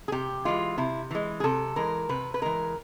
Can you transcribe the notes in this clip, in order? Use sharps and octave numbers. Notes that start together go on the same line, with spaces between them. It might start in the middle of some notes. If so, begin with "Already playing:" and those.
G#4
C3 G4
E3 G#3 F4
C3 E4
E3 G#3
G#4
C3 A4
E3 G#3 A#4
C3 B4
B4
E3 G#3 A#4